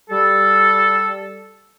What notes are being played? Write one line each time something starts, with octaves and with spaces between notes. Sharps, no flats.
G3 A4